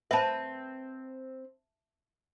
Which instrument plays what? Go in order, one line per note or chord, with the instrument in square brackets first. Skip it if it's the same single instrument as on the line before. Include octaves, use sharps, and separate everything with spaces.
[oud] C4 B4 [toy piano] E5 A5